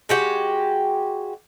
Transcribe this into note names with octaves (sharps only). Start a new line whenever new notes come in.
G#3 F#4 G4